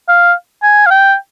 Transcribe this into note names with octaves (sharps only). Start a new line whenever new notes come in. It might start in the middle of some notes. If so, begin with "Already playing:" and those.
F5
G#5
F5
G5